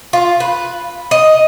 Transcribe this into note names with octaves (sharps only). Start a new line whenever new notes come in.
F4
B4
D#5